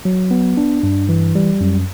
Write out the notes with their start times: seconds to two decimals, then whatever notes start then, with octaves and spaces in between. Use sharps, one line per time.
0.05 F#3
0.31 B3
0.57 D4
0.83 G2
1.09 E3
1.35 G3
1.61 F#2